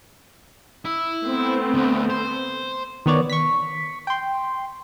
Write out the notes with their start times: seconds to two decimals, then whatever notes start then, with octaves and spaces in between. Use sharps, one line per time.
0.85 E4
1.22 A3 B3 C4
1.74 D2
2.10 C5
3.06 D#3 B3 C#5 D5
3.30 C#6 B6
4.07 G5 C6